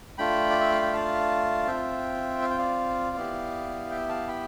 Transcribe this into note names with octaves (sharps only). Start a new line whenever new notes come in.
A3 D4 F4 G5 B5
D5
E5
F5
G5
F5 A5
C4 F4 E5 G5
F5
G5
D5 F5
B3 E4 G4
E5 G5
F5 A5
G5 B5